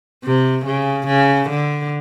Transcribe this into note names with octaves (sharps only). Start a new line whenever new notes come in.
C3
C#3
C#3
D3